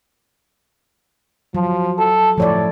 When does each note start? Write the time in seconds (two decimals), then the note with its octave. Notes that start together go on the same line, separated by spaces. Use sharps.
1.55 F3 F#3
1.98 A4
2.38 A2 F3 C#5 D5